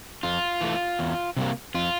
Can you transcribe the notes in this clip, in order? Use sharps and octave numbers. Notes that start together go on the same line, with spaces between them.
F2 F4
E3 A3
E2
C3 G3 A#3
F2 F4